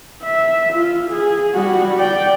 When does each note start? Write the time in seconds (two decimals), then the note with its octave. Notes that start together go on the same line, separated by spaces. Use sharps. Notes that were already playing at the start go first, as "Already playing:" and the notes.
0.24 E5
0.73 F4
1.11 G#4
1.54 G3 F#4
1.97 D5 G5